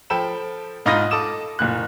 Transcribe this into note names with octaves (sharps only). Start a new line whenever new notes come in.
F3 A4 G5 B5 E7
G#2 D#4 F4 B5 D#6 A#6
A4 D6 D#6 E7
F#1 A#2 F#6